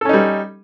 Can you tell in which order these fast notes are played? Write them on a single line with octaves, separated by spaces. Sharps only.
A4 C#4 D#4 G3